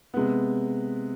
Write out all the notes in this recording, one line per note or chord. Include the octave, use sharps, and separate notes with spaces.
C3 G#3 B3